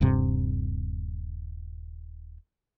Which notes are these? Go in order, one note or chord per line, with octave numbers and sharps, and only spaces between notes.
D#1 G2 C3